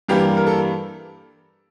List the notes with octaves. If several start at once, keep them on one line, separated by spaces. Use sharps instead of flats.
G2 E3 G3 A#3 G4
A#4
A4